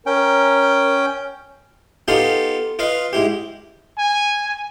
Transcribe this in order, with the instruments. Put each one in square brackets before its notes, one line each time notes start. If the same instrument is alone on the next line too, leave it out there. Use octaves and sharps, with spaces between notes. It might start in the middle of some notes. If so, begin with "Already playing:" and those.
[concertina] C#4 G5 [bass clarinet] A#4
[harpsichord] B3 D#4 F4 G4 A4 F5
F4 B4 D#5 F5
G#2 E4 G4
[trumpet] G#5